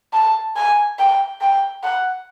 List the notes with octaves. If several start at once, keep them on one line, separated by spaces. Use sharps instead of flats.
A5
G#5
G5
G5
F#5